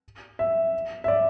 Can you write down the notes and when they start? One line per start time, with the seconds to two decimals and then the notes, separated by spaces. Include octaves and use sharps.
0.39 E5
1.04 E5
1.08 D5